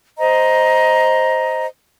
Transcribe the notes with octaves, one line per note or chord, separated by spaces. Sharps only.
C5 D#5 A#5